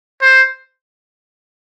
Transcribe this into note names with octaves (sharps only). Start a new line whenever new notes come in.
C5